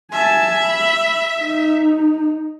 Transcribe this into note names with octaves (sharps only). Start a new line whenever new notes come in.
E5 G#5 A5
B5
D#4